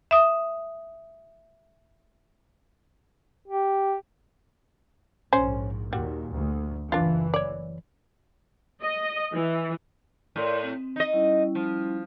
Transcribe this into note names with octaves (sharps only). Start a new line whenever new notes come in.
E5 D#6
G4
A#1 G#2 C#4 C5
D#2 A#2 G3 F#4
D2
F#1 E3 D4 F4
C#5 D5
D#5
E3
A2 A#4 D5 C6
C4
D#4 D#5
G3 C#4 E4
F3